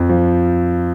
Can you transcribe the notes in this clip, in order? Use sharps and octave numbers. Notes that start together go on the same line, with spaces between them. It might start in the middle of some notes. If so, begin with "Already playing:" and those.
Already playing: F2
F3